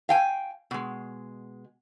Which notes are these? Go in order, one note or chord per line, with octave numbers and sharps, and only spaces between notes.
F5 G5 G#5
B2 G#3